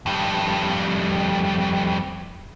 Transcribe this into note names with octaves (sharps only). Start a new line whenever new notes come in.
F2 G3